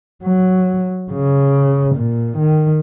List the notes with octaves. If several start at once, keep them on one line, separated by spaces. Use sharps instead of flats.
F#3
C#3
A#2
D#3